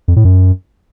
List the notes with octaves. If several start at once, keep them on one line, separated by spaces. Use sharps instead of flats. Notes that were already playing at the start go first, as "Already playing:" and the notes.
F2
A2
F#2